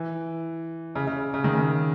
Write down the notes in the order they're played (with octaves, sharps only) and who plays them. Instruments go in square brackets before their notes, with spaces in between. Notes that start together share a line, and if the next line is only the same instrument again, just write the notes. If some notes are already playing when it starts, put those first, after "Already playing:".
Already playing: [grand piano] E3
C#3
C#3
C#3
D#3
C#3